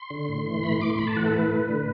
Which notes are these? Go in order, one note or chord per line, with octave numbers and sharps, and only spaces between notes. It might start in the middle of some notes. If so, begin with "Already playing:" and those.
Already playing: C6
D3
A2
E3
A2 B5
C6
A2 D6
C6
A2 B5
A5
E3 F#5
A4
A2 B4
A2
D3